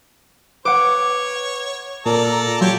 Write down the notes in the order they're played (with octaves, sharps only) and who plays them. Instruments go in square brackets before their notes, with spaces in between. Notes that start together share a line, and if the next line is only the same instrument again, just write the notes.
[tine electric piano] B4 [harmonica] C#5 [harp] F#5 D6
[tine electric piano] A#2 [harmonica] A4 D5 A#5 [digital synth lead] A#4
[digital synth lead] F#3 [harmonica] D4 G4 C#5 [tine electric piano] F4